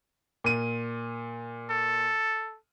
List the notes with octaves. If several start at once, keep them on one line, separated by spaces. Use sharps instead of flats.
A#2 D#7
A4